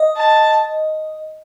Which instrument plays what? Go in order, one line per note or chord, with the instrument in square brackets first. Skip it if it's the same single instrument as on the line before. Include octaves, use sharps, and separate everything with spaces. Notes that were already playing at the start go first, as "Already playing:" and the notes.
Already playing: [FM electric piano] D#5
[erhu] A5